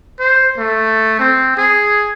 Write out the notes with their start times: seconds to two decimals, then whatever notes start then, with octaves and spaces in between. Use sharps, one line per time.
0.20 C5
0.58 A3
1.20 C4
1.57 G#4